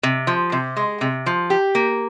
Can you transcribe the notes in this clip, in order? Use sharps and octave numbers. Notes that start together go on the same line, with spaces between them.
C3
F3
C3
G#3
C3
F3
G4
A#3